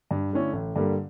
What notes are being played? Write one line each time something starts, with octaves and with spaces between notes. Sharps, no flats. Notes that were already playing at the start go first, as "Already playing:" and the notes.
G2
D3 A3 C#4 E4
A1
G2 D3 G3 A#3